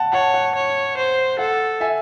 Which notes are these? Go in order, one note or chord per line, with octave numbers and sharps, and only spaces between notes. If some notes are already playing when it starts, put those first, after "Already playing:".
Already playing: F#5 A5
C#5 F#5 A5
F#5
C#5
C5
A4 F#5
E5 G#5